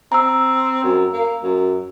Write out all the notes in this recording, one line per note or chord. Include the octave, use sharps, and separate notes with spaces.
C4 A#5 E6
F#2
A#3
F#2